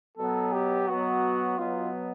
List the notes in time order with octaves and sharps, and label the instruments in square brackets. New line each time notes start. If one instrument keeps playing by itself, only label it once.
[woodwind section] B2 F#3 B3 [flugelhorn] A4
[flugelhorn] G4
[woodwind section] B2 F#3 B3 [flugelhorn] F#4
[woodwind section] B2 F#3 B3 [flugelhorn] F4